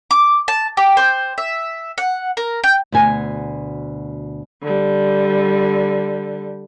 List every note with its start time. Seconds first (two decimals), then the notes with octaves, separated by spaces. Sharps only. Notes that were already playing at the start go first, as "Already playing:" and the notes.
0.11 D6
0.48 A5
0.77 G4
0.97 C5
1.38 E5
1.98 F#5
2.37 A#4
2.64 G5
2.92 D2 B2 G#5
4.62 D3 G3